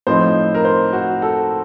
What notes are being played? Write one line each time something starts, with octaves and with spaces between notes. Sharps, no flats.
A2 F3 C4 D#4 C5
A#4
C5
F#4
A4